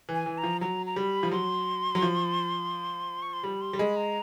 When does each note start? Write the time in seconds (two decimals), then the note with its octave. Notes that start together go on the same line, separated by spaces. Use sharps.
0.09 E3
0.14 G#5
0.26 E3
0.38 A#5
0.43 F3
0.61 F#3 A#5
0.86 A#5
0.96 G3 B5
1.23 F3
1.31 F#3 C6
1.95 F#3
2.02 F3
3.22 C#6
3.33 C6
3.44 G3 B5
3.61 C6
3.73 G3
3.79 G#3 B5
3.96 A#5